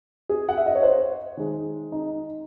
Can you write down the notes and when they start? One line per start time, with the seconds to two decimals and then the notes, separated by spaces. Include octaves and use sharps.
0.29 G#4
0.49 F#5
0.57 E5
0.66 D#5
0.75 C#5
0.83 C5
1.37 D#3 G#3
1.92 D#4